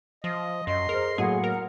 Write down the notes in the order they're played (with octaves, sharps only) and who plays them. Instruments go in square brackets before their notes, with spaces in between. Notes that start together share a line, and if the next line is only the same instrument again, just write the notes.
[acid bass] F3 [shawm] D#5
[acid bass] F#2 [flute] D#5 [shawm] C6
[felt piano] G#4 C5 [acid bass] A#4
[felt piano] A2 F#3 A#3 [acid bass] G#4 [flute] F#5
[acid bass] A#4